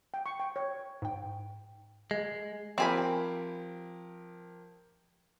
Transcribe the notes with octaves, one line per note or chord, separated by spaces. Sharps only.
G5
C#6
G5
C#5
G#2 G5
G#3
F3 C4 G4 A#4 G#5 B5